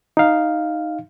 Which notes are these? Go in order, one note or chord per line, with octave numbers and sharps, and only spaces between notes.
D#4 F5